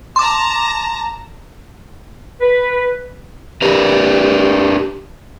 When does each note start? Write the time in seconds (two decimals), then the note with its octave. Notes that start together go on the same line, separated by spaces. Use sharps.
0.16 A5 A#5 C6 D6
2.41 B4
3.62 D4 G4 A#4 B4